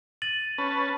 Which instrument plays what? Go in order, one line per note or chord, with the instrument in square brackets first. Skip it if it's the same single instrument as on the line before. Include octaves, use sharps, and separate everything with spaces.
[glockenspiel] A6 D#7 F#7
[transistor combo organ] C#4 B4 A5